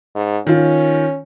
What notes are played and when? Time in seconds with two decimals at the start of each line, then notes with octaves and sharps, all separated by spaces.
0.16 G#2
0.47 D#3 C#4 F4